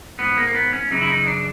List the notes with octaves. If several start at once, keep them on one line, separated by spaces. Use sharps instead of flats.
G#2 E3 B3
A#3
A#3
B3
C#4
F#2 C#3 E3 D#4
E4
D#4
D4